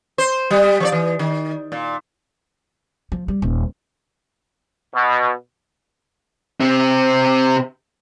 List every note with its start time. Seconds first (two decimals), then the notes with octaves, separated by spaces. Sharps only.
0.18 C5
0.50 G3
0.80 F3 C#5 D5
0.92 E3
1.19 D#3
1.72 A#2
3.12 F3
3.28 G3
3.42 D#1
4.94 B2
6.60 C3 C4